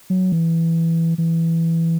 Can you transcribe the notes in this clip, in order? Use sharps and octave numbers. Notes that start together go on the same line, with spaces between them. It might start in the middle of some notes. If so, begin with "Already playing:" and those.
F#3
E3
E3